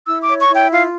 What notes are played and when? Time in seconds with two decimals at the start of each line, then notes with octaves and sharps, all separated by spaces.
0.06 E4 E6
0.23 D6
0.28 C#5
0.39 C#6
0.49 E4
0.55 G5
0.71 F4 F5